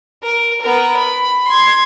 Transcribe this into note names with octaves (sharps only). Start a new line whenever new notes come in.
A#4
B3 A#4
B5
C6 G#6